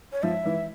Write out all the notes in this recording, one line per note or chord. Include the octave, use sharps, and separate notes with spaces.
C#5
F3 E5
E3